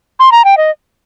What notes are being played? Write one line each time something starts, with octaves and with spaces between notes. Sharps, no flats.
C6
A#5
G5
D#5